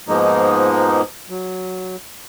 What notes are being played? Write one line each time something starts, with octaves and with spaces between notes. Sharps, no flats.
G#2 B2 F3 G#3 A#3 D#4
F#3